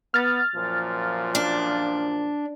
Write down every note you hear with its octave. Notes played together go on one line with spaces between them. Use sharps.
B3 F6 A6
F#2 A#2 F3
D4